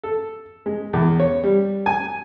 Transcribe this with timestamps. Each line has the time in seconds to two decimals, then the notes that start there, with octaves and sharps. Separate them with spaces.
0.03 A4
0.66 G#3
0.93 E2
1.20 C#5
1.44 G3
1.86 G#5